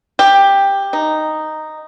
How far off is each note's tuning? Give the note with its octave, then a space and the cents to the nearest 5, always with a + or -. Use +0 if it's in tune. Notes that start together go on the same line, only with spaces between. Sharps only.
G4 +10
D#4 -5